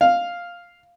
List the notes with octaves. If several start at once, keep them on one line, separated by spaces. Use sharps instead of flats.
F5